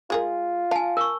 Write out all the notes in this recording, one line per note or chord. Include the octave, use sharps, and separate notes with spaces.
G#3 F4 G#4 A#4
F5 G#5 A5
A#4 C#6